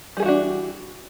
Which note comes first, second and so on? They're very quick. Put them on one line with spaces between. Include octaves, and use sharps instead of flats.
G3 G#4 E3 F#4 D4